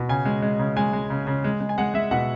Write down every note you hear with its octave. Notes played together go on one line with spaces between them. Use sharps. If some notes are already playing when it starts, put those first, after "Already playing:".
Already playing: B2
C#3 G#5
G#3
G#3
C#3
G#3 G#5
G#3
C#3
C#3
G#3
G#3
G#5
G#3 F#5
G#3 E5
B2 F#5